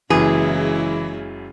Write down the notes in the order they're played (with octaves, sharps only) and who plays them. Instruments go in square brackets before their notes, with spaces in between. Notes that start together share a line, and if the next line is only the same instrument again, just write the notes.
[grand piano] F#1 F#2 [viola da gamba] C#3 G#3 E4 [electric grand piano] E3 [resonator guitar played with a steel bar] G#4